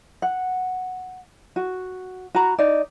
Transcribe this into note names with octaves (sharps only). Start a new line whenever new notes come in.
F#5
F#4
F#4 A#5 B5
D#4 D5